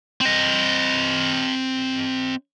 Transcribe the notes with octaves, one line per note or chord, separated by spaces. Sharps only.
C4 D#5